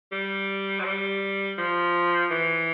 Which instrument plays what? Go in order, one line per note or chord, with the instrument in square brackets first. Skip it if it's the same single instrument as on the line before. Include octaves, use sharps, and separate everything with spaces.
[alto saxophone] G3
F#3
G3
F3
E3